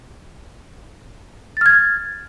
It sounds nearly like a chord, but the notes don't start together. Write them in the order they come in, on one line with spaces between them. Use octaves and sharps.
A6 F6 G#6